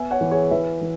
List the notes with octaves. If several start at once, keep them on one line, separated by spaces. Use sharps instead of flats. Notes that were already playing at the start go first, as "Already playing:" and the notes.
Already playing: B3 E5 G#5
C#5 F#5
E3
G#4 C#5
E3 B4 E5
E3